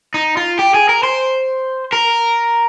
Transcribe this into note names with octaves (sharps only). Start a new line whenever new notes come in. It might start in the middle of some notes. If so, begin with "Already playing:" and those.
D#4
F4
G4
G#4
A#4
C5
A#4